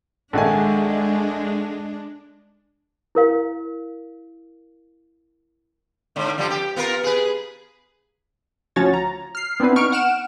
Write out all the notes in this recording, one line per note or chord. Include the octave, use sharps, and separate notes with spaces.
A#1 D#3 G#3 D4 A4 E5 F#5 G#5
E4 A#4 F5
G#2 D3
D3 F3 G3
G4
B3 F4 A#4
G#4 B4
D2 F3 C#4 F#4 C#5 A6
A#5
F6 C7
B3 C4 D4 E4 B4
B3 D#4 C#6 F6 D7
F#5 F6 D7 E7